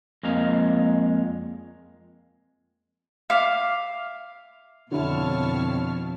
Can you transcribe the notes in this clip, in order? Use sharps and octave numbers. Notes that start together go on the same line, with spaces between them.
F2 G#3 A#3 F5 A#5
E5 F5 D6
F2 B2 D3 E4 C#5 A5 F6